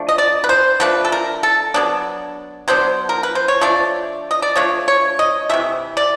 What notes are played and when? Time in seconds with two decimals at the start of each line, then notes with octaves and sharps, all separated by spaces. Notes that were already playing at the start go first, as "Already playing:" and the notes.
Already playing: F3 A3 D4
0.09 D#5
0.18 D5
0.44 B4
0.49 C5
0.80 F3 A3 D4 B4
1.05 A4
1.12 A#4
1.43 A4
1.74 F#3 B3 D4
2.68 F#3 B3 D4 C5
3.09 A#4
3.23 B4
3.35 C5
3.48 C#5
3.61 F3 A3 D4 D5
4.31 D#5
4.42 D5
4.55 F3 A3 D4 C#5
4.88 C#5
5.19 D#5
5.49 C3 E3 A3 E5
5.97 D5